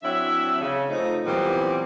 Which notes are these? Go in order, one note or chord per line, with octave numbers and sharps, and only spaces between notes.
F#3 C4 D4 E4 E5
C#3
F3 A3 D#4
A#2 E3 F#3 G3 B3 C4